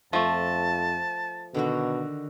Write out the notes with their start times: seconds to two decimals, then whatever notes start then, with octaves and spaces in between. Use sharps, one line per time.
0.13 F2 F3 A3 A5
1.54 B2 D3 D#3 F#4